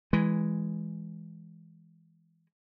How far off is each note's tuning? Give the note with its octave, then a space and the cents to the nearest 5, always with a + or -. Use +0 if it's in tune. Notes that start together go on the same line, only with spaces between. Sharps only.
E3 +0 G#3 +0